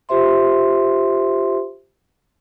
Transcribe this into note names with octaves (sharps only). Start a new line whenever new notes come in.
F4 G4 C5 E5 C6